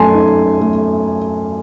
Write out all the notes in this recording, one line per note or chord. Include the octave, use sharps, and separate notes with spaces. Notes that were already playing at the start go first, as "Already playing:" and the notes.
Already playing: F#2 A3 G#5 A5 C6
D#4
A3